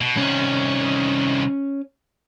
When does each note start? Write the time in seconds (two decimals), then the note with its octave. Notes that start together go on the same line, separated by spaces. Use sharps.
0.01 B2
0.17 C2 D#3 C#4